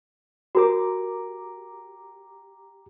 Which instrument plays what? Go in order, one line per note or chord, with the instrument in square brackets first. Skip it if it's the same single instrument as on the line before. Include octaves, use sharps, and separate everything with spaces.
[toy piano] F#4 A#4 [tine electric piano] G4 A#5 D6